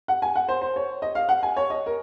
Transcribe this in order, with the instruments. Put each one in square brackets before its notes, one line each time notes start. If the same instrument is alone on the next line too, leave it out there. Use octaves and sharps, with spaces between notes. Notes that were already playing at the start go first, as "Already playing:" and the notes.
[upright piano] F#5
G#5
F#5
C5
C5
C#5
D#5
F5
F#5
G#5
C#5
D#5
A#4